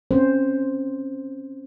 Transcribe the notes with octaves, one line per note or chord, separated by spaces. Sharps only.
C4 C#4 C5